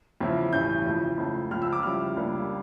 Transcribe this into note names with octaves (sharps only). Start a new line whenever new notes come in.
E2 C#3 F3 C#4 E4
A1 G2 E3 G6
F2 C#3 E3
C#2 C#3 F3 A3
C#2 C#3 F3 F6
E6
D6
F2 C#3 G3 C#4 E4 F6
C#2 C#3 G3 A#3 D4